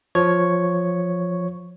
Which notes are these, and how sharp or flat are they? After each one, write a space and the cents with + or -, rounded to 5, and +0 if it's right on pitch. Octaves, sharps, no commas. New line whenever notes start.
F3 +10 C#5 +0 C#6 +0